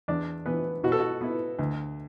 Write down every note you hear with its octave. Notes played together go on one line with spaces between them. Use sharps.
E2 D4 D5
E3 B3 D4 B4
B2 F#4
A4
F#4
B3 E4
D2